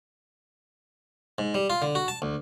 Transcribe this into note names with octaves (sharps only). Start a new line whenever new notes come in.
G#2
G3
F4
D3
F#4
A5
D2